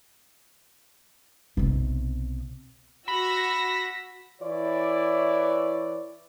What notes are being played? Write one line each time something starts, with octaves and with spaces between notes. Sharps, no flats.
B1 C3
F#4 B5 E6 A#6
E3 E4 C#5 D5